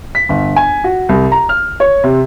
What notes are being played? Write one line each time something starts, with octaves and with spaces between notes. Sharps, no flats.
B6
G1
G#5
F#4
C2
A#5
F6
C#5
C3